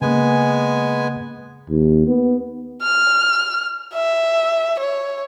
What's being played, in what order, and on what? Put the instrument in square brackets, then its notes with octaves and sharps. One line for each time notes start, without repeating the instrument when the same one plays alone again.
[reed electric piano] C#3 A#3 [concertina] G#3 B3 G#5
[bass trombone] D#2
B3
[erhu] F6
E5
C#5